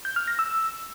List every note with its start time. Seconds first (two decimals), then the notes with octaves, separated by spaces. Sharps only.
0.05 G6
0.16 F6
0.28 A#6
0.39 E6